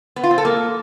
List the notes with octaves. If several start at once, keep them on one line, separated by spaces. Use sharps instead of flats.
B3
F4
C4
A4
A#3